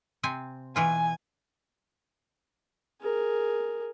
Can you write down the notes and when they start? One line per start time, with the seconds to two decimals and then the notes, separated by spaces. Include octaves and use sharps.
0.23 C3 C4 G#5
0.76 B2 E3 F4 G#5
3.02 G#4 A#4